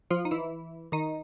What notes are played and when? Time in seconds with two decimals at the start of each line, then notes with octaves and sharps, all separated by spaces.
0.10 F3 F4
0.25 D#4
0.31 E3 E4
0.92 D#3 D#4